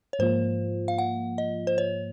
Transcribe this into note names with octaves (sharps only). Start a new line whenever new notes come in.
C#5
G#2 F3 A#3 F4 C5
F5
F#5
D#5
C5
C#5